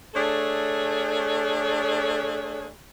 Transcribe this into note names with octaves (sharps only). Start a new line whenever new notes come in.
A3 D4 G#4 A4 C#5